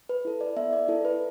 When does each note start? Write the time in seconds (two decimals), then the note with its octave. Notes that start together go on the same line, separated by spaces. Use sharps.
0.09 B4
0.25 E4 A4
0.41 D5
0.56 B3 E5
0.73 D5
0.88 E4 A4
1.05 B4